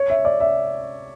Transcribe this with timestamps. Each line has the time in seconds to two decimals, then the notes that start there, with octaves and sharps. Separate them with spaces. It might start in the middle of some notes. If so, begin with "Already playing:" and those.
Already playing: C#5
0.10 E5
0.25 D5
0.40 E5